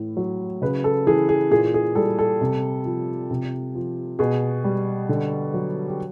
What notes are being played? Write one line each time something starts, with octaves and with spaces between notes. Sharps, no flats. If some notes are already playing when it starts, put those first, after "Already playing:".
Already playing: A2 E3
F#3
C#3 B4
A4
E3 G#4
G#4
A#2 G#4
G#4
G3 A4
A4
C3
F3
C3
F3
B2 G#4
G3
D3
F#3
G4